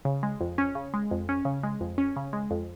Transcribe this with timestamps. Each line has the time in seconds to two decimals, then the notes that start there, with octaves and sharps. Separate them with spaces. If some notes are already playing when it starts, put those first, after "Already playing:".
0.05 C#3
0.23 G#3
0.40 F2
0.58 C#4
0.75 C#3
0.94 G#3
1.11 F2
1.29 C#4
1.45 C#3
1.63 G#3
1.81 F2
1.98 C#4
2.16 C#3
2.33 G#3
2.51 F2